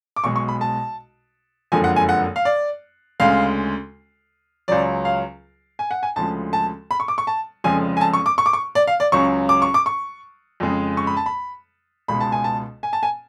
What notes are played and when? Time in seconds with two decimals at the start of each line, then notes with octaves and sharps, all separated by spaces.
0.16 D6
0.24 B1 B2 G#3 C#6
0.36 C#6
0.48 B5
0.61 A5
1.72 F#1 F2 D3 F3 G#3 G#5
1.84 F#5
1.96 G#5
2.09 F#5
2.36 F5
2.45 D5
3.20 D2 C#3 G#3 F5
4.68 C#2 C#3 F#3 D5
5.05 F5
5.79 G#5
5.91 F#5
6.03 G#5
6.16 D2 C#3 F3 G#3 A5
6.53 A5
6.91 B5
7.00 C#6
7.08 D6
7.18 C#6
7.27 A5
7.64 F1 F2 C#3 F3 G#3 G#5
7.97 G#5
8.01 A5
8.13 C#6
8.26 D6
8.38 C#6
8.46 D6
8.53 C#6
8.75 D5
8.87 F5
9.00 D5
9.12 C#2 C#3 F#3 C#6
9.49 D6
9.62 C#6
9.74 D6
9.86 C#6
10.60 F2 C#3 G#3
10.97 C#6
11.07 B5
11.17 A5
11.26 B5
12.08 C#2 B2 G#3 B5
12.20 A5
12.32 G#5
12.44 A5
12.83 G#5
12.93 A5
13.03 G#5